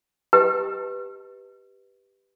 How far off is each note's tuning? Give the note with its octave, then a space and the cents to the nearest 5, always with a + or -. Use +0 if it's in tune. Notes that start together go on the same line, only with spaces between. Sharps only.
G4 +0 B4 +0 D#5 +0